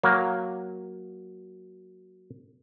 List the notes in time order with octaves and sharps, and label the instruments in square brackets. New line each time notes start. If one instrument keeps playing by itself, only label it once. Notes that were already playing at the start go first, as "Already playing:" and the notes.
[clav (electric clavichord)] F#3 A#3